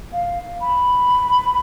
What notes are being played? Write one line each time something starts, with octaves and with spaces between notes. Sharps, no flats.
F5
B5